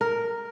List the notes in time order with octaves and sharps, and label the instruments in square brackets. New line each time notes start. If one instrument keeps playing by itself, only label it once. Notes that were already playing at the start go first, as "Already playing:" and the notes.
[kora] A#4